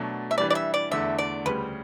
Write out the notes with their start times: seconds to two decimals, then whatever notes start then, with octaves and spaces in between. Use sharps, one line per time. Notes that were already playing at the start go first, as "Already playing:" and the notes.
Already playing: B2 F#3 A3 D4
0.31 E5
0.38 E3 G3 D4 D5
0.50 D5
0.55 E5
0.74 D5
0.91 E2 D3 A3 D4 E5
1.19 D5
1.45 D2 C#3 G3 B4